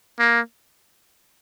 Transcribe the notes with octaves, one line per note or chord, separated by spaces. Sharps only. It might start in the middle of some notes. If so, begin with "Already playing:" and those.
A#3